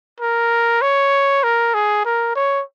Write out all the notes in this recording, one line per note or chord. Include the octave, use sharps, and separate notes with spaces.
A#4
C#5
A#4
G#4
A#4
C#5